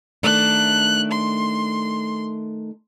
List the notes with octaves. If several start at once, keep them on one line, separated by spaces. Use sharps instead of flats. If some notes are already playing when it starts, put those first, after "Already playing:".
D#3 A3 D4 F#6
C6